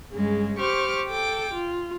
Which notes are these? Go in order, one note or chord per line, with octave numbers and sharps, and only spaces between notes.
G2 C#3 G#3
G4 C5 C#6 D6 F6
A4 G5 D6
F4